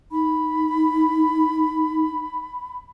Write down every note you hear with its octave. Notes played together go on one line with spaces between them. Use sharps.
D#4 B5